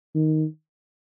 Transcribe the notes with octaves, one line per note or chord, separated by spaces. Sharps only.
D#3